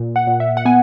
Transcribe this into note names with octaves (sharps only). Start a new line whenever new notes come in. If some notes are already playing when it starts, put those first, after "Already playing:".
Already playing: A#2
F#5
A#2
E5
F#5
B3 G#5